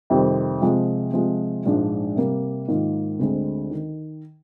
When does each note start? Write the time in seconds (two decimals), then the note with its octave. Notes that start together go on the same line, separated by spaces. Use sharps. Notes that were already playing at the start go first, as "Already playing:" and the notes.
0.10 F2 C3 D#3 G3 C4
0.61 C3 F3 G#3
1.14 C3 F3 G#3
1.65 A#1 G#2 F3 G#3 D4
2.16 C3 G3 A#3
2.68 G#2 D#3 A#3 F4
3.19 D2 D3 G#3 C4
3.71 D#3